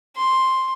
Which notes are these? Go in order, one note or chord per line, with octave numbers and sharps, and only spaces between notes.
C6